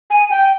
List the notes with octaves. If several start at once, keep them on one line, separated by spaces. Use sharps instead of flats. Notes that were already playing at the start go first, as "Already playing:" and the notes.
G#5
G5